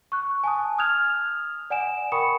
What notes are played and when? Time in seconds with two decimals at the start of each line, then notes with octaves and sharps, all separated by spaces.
0.12 C#6 F#6
0.44 G#5 A5 D#6
0.78 D#6 F6 F#6 G#6 F7
1.70 D5 F#5 G#5 D7 E7
2.12 A#4 G5 B5 C#6 D#6 C#7